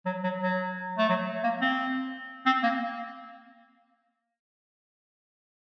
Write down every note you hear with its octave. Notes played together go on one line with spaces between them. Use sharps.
F#3
F#3
F#3
A3
F#3
A#3
C4
C4
A#3